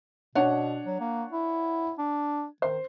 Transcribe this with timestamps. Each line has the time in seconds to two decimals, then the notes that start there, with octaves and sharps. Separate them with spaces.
0.35 B2 D4 C#5 F#5
0.86 F#3
1.00 A#3
1.33 E4
1.98 D4
2.62 D#3 C5